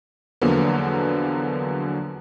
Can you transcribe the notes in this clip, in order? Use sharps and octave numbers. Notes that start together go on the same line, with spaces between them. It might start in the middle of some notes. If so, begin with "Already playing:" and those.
E2 D3 F3 F#3 A#3 B3